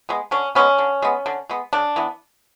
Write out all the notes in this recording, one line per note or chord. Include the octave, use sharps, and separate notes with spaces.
G#3 B3
D3 C#4
G#3 B3 C#4
D3
G#3 B3
D3
G#3 B3
C#3 D4
E3 B3